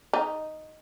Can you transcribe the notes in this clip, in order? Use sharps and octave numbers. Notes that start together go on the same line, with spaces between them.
D#4